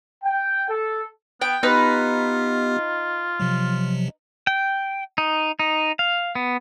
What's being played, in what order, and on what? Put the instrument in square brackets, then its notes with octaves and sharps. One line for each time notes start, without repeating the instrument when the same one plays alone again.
[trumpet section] G5
A4
[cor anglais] B3 [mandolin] G5
[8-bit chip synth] B3 G4 [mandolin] D#4 B4 [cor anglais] F4
[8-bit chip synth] C3 F3 F#3
[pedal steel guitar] G5
D#4
D#4
F5
B3